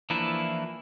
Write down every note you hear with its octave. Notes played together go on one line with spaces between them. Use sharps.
E3 F3 A#3 D4 E4